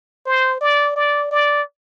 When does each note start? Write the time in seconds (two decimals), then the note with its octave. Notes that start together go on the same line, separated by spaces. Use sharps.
0.26 C5
0.61 D5
0.96 D5
1.31 D5